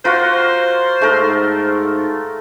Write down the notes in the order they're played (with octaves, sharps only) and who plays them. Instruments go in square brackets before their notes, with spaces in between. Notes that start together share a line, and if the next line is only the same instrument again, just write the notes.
[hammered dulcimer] F4 [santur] F#4 A#4 [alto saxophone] C5
[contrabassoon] G#2 [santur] A3 A4 A#4